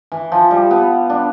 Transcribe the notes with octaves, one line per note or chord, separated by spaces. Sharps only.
E3
F3
G3
B3
D4